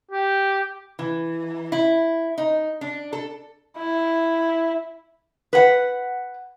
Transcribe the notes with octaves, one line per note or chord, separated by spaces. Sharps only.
G4
E3
E4
D#4
D4
A4
E4
B4 F#5